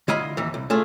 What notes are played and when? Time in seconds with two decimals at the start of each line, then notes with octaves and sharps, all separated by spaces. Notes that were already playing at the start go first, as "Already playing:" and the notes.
0.08 D3 E4 F4 D#5 B5
0.37 D#2 E3
0.54 C2
0.70 A3 F4 G#4